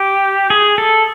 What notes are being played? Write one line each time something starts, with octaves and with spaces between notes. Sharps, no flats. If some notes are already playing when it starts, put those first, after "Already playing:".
Already playing: G4
G#4
A4